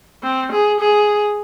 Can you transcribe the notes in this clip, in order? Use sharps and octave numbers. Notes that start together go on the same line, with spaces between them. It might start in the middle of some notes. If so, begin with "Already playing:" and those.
C4
G#4
G#4